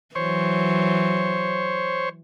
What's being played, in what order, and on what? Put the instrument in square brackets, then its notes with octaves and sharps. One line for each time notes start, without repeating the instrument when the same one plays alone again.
[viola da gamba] E3 F#3 [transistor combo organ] C5 C#5